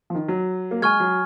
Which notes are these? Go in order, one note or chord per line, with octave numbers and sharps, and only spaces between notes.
F3
D#3
F#3
A#3
G#3 G#5 C#6 F6 G#6
F#3